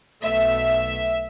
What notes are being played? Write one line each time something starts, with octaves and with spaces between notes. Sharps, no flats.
B1 B2 A3 E5